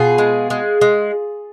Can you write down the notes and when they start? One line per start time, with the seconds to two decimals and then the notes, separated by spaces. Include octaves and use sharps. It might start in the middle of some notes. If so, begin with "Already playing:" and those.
Already playing: B2 F4 G#4
0.18 G#3
0.50 G#3
0.81 G#3